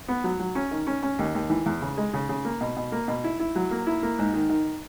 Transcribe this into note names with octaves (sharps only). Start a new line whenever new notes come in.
B3
F#3
F#3
C#4
D#3
C#4
C#4
D#2
D#2
E3
E2
C#3
G#3
C#3
C#3
A#3
B2
B2
A#3
B2
E4
E4
F#3
A#3
E4
A#3
G#2
D#3
D#3